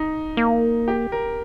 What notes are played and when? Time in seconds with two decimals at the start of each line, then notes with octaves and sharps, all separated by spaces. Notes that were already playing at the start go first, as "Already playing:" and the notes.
Already playing: D#4
0.37 A#3
0.88 G4
1.12 A#4